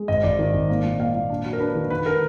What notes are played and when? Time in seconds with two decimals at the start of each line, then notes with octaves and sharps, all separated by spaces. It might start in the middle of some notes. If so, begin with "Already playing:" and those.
Already playing: G#3
0.08 G#1 D#5
0.23 G#1 D5
0.39 D#3
0.54 G#1
0.69 A#3
0.84 A#2
0.99 A#3 F5
1.15 A#2
1.30 D4
1.45 F#3
1.53 A#4
1.60 D4 B4
1.75 D#3
1.90 D3 B4
2.06 D3 A#4